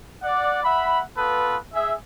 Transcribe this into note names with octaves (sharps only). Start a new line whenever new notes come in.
D5 F#5
E5 F#5 B5
B3 F4 A4 B4
G#4 E5